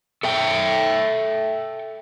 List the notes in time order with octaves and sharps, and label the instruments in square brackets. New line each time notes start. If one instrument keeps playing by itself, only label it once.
[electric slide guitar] A4 E5 G5